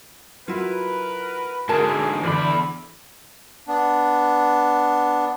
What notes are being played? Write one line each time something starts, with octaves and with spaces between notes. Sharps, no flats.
F#3 E4 F4 A#4 B4
G#2 D3 F#4 G#4 A#4 A5
E2 D3 E3 C5 D5 B5
B3 D4